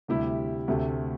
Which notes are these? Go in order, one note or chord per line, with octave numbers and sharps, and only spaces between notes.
D2 C3 G3 E4 G4
D2 C3 A3